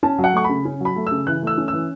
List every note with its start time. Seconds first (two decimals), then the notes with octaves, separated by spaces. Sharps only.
0.03 C#4 A5
0.19 F#3
0.24 F#5
0.33 A3 C#6
0.44 C#3 B5
0.65 C#4
0.80 F#3 B5
0.96 A3
1.07 C#3 E6
1.27 E3 F#6
1.42 A3 E6
1.58 C#4
1.68 E6
1.73 E3